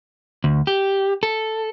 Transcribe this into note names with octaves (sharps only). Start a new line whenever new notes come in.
D2
G4
A4